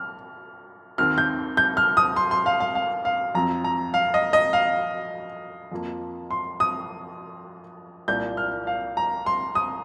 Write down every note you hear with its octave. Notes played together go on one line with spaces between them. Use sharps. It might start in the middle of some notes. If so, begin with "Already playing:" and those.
Already playing: F6
D#2 D#3 C4 F6
G6
G6
F6
D#6
C6
C6
F5
F5
F5
F5
F2 F3 C4 A#5
A#5
F5
D#5
D#5
F5
F2 F3 A#3
C6
D#6
C2 A#2 A#3 G6
F6
F5
A#5
C6
D#6